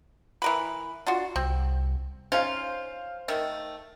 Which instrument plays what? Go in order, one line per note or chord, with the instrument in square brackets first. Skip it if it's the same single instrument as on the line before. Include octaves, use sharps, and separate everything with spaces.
[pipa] E3 A#4 B4
D4 F4 F#4
[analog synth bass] C2 [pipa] C4
[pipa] C#4 D#4 F4 [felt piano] C5 F5
[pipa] D#3 A3 E5